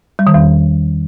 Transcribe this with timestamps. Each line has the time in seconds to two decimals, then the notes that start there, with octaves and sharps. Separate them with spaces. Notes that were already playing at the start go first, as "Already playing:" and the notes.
0.19 G3
0.27 D#3
0.34 E2